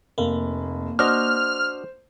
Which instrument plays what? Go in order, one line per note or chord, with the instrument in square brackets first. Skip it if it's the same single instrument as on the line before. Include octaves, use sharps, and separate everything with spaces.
[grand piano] F1 [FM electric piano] A#3
[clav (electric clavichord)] D4 F#4 D#5 [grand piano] C5 [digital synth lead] F6